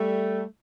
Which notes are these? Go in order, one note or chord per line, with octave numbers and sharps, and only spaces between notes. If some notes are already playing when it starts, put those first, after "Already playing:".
Already playing: G3 A3